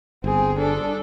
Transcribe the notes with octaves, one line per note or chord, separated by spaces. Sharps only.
G1 C4 G#4
D4 A4